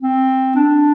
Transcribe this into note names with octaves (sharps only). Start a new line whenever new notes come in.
C4
D4